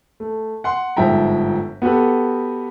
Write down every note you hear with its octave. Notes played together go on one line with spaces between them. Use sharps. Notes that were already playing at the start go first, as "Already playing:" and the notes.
A3
F#5 C6
G1 G#2 F3 E5 G5 A#5
B3 F#4 G4 A4 B4